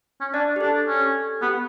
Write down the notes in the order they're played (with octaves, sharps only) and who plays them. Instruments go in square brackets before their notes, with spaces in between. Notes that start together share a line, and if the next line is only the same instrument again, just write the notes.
[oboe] C#4
[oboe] D4 [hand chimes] D5
[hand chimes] G4
[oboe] D4 [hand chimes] A4
[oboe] C#4
[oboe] B3 [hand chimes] G4